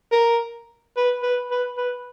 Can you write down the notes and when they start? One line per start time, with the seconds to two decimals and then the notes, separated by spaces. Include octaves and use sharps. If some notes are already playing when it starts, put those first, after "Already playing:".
0.12 A#4
0.97 B4
1.23 B4
1.51 B4
1.77 B4